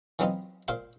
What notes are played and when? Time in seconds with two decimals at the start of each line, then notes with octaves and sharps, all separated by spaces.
0.19 E3 F#3 B3 C4 D#4 F4
0.68 A#2 C5 F5 C6